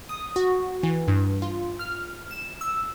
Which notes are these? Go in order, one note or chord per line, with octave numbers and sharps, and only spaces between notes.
D#6
F#4
E3
G2
F4
F6
E7
E6